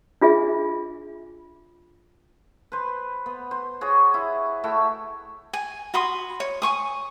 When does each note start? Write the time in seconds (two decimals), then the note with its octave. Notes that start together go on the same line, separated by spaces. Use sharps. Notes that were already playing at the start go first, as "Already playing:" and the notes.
0.21 D4 F4 G#4 E5
2.72 B4 C5
3.26 B3
3.51 C5
3.81 F#4 G#4 C#5
4.14 E4
4.64 A3 E4 F#4 G5
5.53 G#5
5.94 F#4 B5 C6 D#6
6.40 C#5
6.62 G#5 C#6 D#6